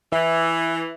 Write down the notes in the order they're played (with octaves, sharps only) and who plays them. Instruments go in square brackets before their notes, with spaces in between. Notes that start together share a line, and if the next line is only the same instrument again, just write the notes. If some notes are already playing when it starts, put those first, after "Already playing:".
[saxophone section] E3 [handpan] E5